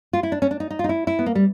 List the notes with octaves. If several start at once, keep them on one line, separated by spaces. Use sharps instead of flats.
F4
E4
D4
C#4
D4
D#4
D#4
F4
D#4
E4
E4
B3
A#3
G3